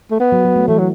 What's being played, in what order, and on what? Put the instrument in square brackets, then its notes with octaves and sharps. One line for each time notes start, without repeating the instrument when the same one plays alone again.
[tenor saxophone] A3
B3
[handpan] F#3
F#3
A3
[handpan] E3 [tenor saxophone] A3
[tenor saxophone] F#3